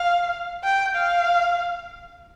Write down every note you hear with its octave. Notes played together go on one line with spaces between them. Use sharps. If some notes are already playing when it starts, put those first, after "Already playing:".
Already playing: F5
G5
F5